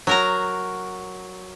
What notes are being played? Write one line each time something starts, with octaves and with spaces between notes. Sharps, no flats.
F#3 A#4 A#5